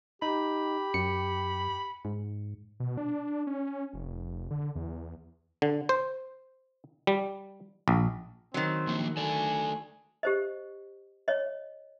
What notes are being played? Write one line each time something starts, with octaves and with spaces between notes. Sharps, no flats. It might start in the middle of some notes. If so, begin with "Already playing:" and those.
D#4 G4 B5
F#2 C#7
G#2
B2
D4
C#4
F1
D3
E2
D3
C5
G3
A#1
D#3 F#3 C4
F3 A#3
A3 A4 D5 G#5
G4 C5 D#5
C#5 D#5